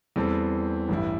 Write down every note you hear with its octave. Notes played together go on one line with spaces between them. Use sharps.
E2 E3 G3 C4 A4
A1 G2 G3 E4